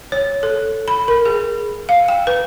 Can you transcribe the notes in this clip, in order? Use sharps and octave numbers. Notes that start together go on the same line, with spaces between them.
C#5
A4
B5
A#4
G#4
F5
G5
B4